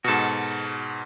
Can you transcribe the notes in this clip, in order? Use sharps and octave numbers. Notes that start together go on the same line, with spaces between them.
G#2 B2 F#4 A4